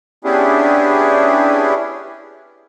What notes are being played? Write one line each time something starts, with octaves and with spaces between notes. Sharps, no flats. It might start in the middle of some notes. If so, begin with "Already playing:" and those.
B3 C#4 D4 E4 G4 G#4